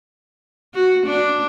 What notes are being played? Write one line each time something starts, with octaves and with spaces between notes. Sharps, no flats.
F#4
D4